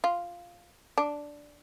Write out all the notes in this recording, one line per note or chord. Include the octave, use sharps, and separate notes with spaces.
F4
D4